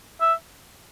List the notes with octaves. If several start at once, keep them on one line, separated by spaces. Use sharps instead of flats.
E5